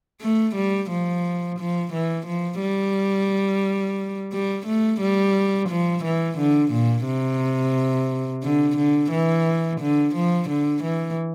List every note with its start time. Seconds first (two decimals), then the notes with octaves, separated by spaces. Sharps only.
0.21 A3
0.56 G3
0.90 F3
1.59 F3
1.93 E3
2.26 F3
2.62 G3
4.33 G3
4.66 A3
5.01 G3
5.69 F3
6.04 E3
6.38 D3
6.71 A#2
7.06 C3
8.43 D3
8.77 D3
9.11 E3
9.81 D3
10.15 F3
10.49 D3
10.83 E3